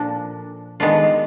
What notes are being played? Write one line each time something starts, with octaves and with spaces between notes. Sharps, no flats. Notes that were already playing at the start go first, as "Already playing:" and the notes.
Already playing: A#2 F3 A#3 D4
D#3 G#3 B3 D4 F4